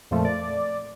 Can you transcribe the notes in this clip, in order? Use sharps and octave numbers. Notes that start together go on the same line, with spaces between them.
F2 A#2 F3 A3
D5